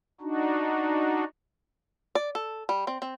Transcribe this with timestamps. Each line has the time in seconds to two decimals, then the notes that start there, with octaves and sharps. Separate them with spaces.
0.21 D4 D#4 F#4
2.15 D5
2.35 A4
2.69 G3
2.87 C4
3.02 C4